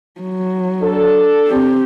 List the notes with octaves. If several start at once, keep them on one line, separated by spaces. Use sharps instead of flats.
F#3
D4 A4
C4 G4